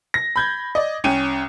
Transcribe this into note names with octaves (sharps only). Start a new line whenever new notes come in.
A#6
B5 G6 G#6
D5 D#5
C2 C#4 G5 D#7